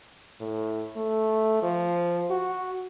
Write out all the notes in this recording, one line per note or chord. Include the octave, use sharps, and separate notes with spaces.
A2
A3
F3
F#4